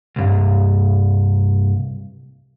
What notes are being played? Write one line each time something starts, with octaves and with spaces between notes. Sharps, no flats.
C2 G2